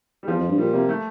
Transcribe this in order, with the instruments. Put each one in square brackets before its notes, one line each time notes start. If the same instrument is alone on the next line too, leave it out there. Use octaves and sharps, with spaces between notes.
[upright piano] G3
[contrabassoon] E2 [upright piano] F3
[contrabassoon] F2
G2
[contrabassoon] A#2 [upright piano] G3
[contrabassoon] C3 [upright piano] A#3
[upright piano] A3